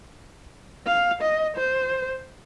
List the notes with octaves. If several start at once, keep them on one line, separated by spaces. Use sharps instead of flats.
F5
D#5
C5